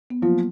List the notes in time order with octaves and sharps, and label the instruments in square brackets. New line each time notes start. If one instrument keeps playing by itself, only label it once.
[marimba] B3
[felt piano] F3 [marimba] F#3 A#3